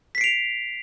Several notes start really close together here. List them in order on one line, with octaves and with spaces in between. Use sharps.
B6 C7 D7 F7